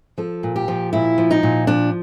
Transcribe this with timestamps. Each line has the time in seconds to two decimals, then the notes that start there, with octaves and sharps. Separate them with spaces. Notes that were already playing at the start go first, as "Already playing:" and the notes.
0.18 F3 A4
0.43 A#2
0.56 G4
0.68 F3
0.93 A#2 E4
1.18 F3
1.31 D#4
1.43 A#2
1.67 F3 D4